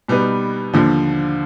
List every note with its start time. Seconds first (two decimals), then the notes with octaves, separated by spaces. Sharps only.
0.08 B2 G3 B3 D#4 B4
0.73 D#2 D3 F3